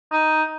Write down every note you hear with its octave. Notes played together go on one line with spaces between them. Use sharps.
D#4